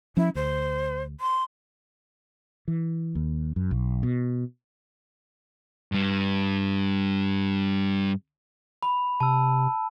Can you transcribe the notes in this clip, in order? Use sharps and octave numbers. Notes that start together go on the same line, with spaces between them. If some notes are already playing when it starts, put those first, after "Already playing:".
F3 C#4 E4
D2 C5
C6
E3
D#2
F#2
B1
B2
G2 G3
B5
C3 A5 E6